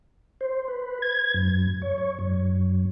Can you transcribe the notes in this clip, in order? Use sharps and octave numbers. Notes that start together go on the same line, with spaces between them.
C5
B4
G#6
F#2
C#5
C#5
F#2